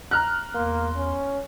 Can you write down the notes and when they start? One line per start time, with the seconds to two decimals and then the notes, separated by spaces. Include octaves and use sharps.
0.11 A#5 F6 F#6
0.54 E2 A#3 C6
0.96 C#4